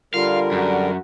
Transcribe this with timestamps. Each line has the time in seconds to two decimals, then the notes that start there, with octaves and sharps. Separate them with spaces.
0.14 D3 G3 F4 A#4 F5
0.52 F#2 F#4